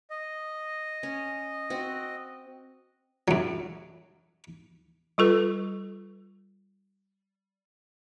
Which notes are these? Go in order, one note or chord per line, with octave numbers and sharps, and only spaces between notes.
D#5
C#4
C4 F#4
F#2 F#3
G3 F4 A4 B4